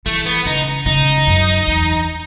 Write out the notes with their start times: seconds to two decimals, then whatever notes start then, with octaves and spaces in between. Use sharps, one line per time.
0.06 E3 A3
0.26 B3
0.46 C#3 D#4
0.86 C#3 D#4
1.16 E2
1.27 F#2
1.68 E2